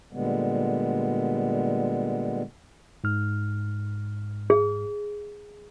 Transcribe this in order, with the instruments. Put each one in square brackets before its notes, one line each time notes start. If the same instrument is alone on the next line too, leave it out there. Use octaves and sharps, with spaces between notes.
[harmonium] A#2 D3 G3 G#3 B3
[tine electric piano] G#2 F6
[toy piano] G#4